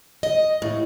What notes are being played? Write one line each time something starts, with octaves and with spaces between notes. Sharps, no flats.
D#5
A2